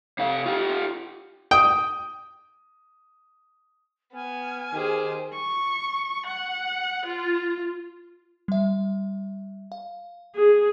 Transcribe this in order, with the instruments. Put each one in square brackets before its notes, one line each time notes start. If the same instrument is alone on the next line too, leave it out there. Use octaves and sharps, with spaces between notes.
[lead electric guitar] C3 F5
F4 G4
[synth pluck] G5 [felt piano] D#6
[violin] B3 [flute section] G#5 F6
[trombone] D#3 [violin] G4 C5 [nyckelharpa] G#4
[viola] C#6
F#5
F4
[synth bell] G3 E5
F5
[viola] G#4